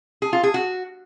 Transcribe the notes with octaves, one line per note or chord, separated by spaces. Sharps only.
G#4
F4
G#4
F#4